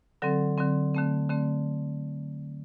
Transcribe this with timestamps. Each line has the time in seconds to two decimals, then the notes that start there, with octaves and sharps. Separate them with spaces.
0.22 D3 F#3 C4 A4
0.58 D3 F#3 C4
0.95 D3 A3 C4
1.30 D3 A3 C4